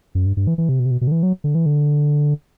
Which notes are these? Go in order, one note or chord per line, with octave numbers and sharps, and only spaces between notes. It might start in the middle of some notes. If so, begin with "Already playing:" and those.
F#2
G2
G2
E3
E3
C3
B2
C3
B2
B2
D3
E3
F#3
D3
E3
D3